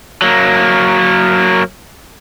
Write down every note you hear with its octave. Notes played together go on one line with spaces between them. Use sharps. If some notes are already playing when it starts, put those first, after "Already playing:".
F#3 A#3